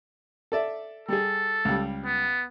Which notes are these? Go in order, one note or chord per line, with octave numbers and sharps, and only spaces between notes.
A4 D5 E5
G3 G#4 A4
C#2 G3
B3